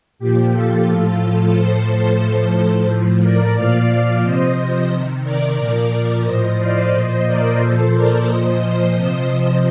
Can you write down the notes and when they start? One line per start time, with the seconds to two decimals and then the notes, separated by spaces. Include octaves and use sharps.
0.19 A#2 F3 G4
0.52 F4 A4
0.86 A2 F3
1.53 A2 F3 A4 C5
1.87 A4 C5
2.21 A2 F3
2.88 A2 F3
3.22 A#4 D5
3.55 A#2 F3 D5 F5
4.23 C3 F3 C5 D#5
4.90 C3 D#3
5.24 A#4 D5
5.57 A#2 F3
5.91 A#4 D5
6.24 A2 F3 C5 D#5
6.58 D5 F5
6.92 A#2 F3 C5 D#5
7.26 A#4 D5
7.59 A#2 F3 A4 C5
7.93 A#4 D5
8.26 A#2 F3 C5 D#5
8.60 C5 D#5
8.95 C3 F3